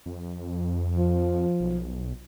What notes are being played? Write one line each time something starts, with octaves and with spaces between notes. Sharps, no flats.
F2
F3
B1